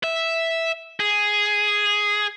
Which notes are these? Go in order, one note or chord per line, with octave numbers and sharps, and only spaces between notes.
E5
G#4